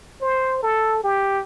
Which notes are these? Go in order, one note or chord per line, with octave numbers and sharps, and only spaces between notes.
C5
A4
G4